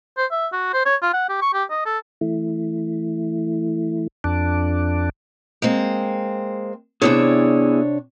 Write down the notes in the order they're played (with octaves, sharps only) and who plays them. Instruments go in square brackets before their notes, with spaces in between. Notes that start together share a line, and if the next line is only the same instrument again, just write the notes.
[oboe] C5
E5
F#4
C5
C#5
F4
F#5
G4
C#6
G4
D#5
A4
[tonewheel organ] E3 A3 E4
F2 D4
[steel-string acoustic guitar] G#3 A#3 C4
[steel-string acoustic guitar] C3 D4 C#5 [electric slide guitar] B3 E4 G#4